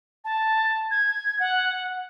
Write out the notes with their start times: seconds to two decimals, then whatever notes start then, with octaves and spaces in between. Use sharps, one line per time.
0.25 A5
0.91 G#6
1.40 F#5